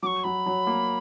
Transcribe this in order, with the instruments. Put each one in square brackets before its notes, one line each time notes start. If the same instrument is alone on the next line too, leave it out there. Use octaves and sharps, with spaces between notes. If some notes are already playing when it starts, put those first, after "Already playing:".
[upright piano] F#3 [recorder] C#6 D6
[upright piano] F#3 [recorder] B5
[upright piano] F#3
A#3